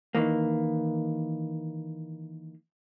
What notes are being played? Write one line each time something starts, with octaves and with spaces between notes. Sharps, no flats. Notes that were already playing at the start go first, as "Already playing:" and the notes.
D#3 E3 A#3